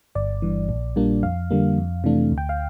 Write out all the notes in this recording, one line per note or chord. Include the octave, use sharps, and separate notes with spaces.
G1 D5
G2 E3
A#1
A#2 G3 A#3 D4
F2 F5
D3 G3 A#3
F2
C3 E3 A3 D4
D2
G5
F5